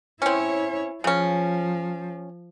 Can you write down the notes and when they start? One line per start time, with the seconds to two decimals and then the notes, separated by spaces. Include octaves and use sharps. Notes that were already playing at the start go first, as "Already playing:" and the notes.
0.22 C4 C#4 E4 C#5
1.04 C#3 F3 C#4